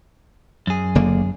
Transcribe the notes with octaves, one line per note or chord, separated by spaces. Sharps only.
F#2 G#4
F#1 D3 A#3